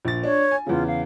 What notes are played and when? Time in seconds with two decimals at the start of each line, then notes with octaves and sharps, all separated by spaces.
0.05 A#1 A6
0.24 D4 C#5
0.51 G#5
0.67 E2 C#3 F4
0.87 F5